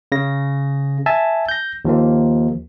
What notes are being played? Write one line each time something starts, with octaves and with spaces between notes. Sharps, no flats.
C#3 A#6
E5 G#5 A5
G6 A#6
D#2 F3 A#3